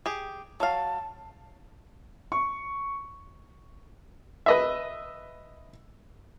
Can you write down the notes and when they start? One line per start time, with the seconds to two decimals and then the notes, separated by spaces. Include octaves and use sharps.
0.06 G4 G#4
0.60 F#3 F5 A5
2.32 C#6
4.46 B4 D#5 E5